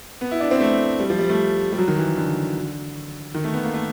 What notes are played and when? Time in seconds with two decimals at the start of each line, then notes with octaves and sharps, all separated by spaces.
0.21 B3
0.31 E4
0.40 D4
0.51 C4
0.60 A3
1.00 G3
1.10 F3
1.19 G3
1.29 A3
1.73 G3
1.78 F#3
1.88 D#3
1.98 E3
2.17 D3
3.35 D#3
3.44 A3
3.54 B3
3.64 A#3
3.74 A3